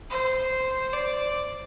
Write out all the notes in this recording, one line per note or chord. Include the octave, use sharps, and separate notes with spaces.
C5
D5